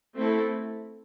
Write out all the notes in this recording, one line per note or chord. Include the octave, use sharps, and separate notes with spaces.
A3 C4 E4 A4